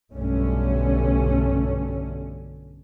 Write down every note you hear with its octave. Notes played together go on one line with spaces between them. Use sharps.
B1 G2 D3 A3 C#4